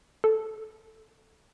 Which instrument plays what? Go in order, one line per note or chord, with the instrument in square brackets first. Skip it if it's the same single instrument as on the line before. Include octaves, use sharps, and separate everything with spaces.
[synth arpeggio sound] A4